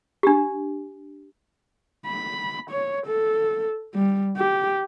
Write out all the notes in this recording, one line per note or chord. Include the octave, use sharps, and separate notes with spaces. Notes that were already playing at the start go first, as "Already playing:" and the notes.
D4 G4
B5
C#5
A4
G3
G4